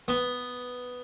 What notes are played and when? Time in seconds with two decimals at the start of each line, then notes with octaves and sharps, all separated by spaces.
0.08 B3